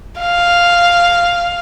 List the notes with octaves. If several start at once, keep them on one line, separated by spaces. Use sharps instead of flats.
F5